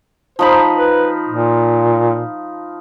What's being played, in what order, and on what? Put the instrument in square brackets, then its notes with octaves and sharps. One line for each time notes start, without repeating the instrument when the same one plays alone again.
[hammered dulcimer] F3 D#4 B5 [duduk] C5
[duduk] B4
A#2